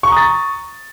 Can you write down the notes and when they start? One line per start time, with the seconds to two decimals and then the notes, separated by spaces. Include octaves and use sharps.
0.03 C#6
0.08 A#5
0.12 D#6
0.17 A6